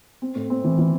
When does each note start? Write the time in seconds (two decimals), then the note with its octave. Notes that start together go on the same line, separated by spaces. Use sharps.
0.22 C4
0.35 A2
0.50 C4
0.64 E3
0.78 E3